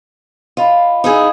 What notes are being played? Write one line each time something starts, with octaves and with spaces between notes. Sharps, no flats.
F4 D#5 F5 B5
D#4 E4 G#4